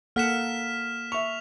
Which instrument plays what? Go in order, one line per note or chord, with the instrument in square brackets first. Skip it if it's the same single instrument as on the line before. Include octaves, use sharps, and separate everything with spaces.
[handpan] A#3 A4 F#5 [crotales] F6 B6 E7
[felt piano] E5 C#6 [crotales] F7